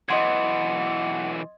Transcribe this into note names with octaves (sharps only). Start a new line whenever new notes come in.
B1 E3 D#5 F#5 C6 G#6